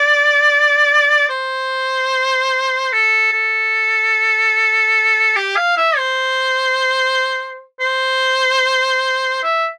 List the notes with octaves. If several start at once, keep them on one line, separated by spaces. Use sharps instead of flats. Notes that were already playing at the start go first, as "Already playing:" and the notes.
Already playing: D5
C5
A4
A4
G4
F5
E5
C5
C5
E5